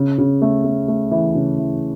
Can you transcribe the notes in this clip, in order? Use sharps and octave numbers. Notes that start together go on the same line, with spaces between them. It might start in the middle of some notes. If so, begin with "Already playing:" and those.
Already playing: C#3
C#3
A3
A3
A3
E3
C#3
E3